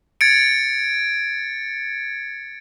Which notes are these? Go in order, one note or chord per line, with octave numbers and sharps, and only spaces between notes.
G#6 A6 C#7 D7